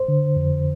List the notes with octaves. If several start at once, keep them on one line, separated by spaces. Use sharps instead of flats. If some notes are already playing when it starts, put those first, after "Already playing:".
Already playing: C5
D3
F2